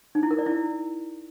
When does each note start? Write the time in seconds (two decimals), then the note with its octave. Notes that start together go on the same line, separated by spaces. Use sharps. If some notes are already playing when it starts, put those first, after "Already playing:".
0.15 D#4
0.23 E4
0.31 A#4
0.38 D5
0.46 E4